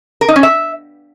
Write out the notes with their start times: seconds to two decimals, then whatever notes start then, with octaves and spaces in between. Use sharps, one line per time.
0.21 A#4
0.28 D#4
0.36 C#4
0.43 E5